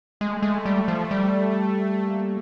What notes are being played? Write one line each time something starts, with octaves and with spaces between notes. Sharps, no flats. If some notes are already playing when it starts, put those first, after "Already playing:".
G#3 A3
G#3
G3
F3
G3
A#3